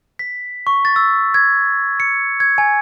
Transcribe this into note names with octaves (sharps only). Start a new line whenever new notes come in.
B6
C#6
A6
E6
G#6
C#7
G#6
G#5